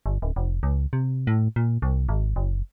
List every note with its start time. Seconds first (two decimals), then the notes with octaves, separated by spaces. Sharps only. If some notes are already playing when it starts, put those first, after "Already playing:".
0.06 G1
0.22 D1
0.36 F1
0.63 C#2
0.93 C3
1.27 A2
1.56 A#2
1.82 C2
2.09 G#1
2.36 F#1